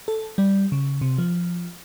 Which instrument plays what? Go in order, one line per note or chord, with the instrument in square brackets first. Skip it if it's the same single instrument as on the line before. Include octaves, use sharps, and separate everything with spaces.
[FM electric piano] A4
G3
C#3
C3
F3